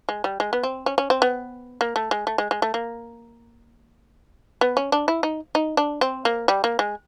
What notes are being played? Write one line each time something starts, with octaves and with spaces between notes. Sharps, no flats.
G#3
G3
G#3
B3
C4
C#4
C#4
C4
B3
A#3
A3
G#3
A3
G#3
G#3
A3
A#3
B3
C#4
D4
E4
D#4
D#4
D4
C4
A#3
G3
A#3
G#3